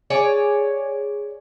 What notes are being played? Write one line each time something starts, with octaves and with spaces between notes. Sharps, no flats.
G#4 C#5 D5